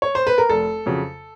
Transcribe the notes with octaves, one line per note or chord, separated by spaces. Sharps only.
C#5
C5
B4
A#4
F1 A4
F2 C#3 F#3